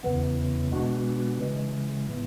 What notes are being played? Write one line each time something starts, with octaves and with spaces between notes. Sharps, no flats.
E2 C#3 E3 B3
B2 G#3 B3 D4 F#4
C#3 E3 G#3
A2 E3 B3